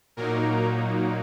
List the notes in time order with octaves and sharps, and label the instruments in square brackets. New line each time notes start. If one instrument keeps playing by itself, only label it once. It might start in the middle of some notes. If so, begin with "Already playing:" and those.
[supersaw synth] A#2 F#3 A#3 D#4 A#4